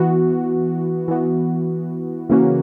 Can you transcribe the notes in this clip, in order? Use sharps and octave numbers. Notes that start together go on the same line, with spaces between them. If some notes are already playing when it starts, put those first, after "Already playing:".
Already playing: E3 B3 F#4
E3 B3 F#4
C#3 E3 A#3 C#4 F#4